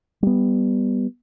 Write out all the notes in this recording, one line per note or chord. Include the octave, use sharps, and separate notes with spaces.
G3 B3